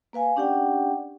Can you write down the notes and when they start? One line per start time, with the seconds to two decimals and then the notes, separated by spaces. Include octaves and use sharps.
0.13 A#3 B4 F5 G#5
0.36 C#4 D4 G4 D5 F#5 G5